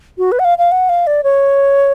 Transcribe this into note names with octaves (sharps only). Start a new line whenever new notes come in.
F#4
B4
F#5
F5
F5
F#5
F5
D5
C#5